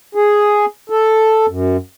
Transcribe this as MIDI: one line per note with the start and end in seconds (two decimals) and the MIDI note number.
0.15 0.66 68
0.90 1.46 69
1.49 1.77 42